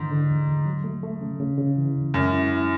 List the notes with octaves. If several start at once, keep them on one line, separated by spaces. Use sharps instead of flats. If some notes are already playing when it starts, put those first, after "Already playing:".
Already playing: G#2 D3 E3
D3
D2
D2
F#3
A3
A3
C#3
C#3
C#3
E3
D2
F#2 G#3
E4
E4